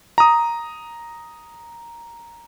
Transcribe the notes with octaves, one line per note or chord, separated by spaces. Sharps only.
A#5 D#6